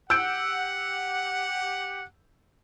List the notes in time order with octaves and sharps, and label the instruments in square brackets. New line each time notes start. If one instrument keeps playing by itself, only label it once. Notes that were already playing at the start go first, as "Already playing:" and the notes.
[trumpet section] G4 F#5 [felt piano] E6 G6 D7